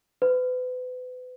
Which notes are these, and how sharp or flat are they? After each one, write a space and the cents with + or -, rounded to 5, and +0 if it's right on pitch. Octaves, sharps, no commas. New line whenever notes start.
B4 +35